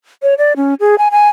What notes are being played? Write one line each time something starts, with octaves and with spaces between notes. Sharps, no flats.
C#5
D5
C#4
G#4
G#5
G#5